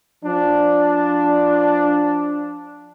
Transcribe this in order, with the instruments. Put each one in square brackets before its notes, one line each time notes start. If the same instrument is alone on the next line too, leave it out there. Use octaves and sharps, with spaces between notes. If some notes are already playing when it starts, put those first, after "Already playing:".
[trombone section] F3 D4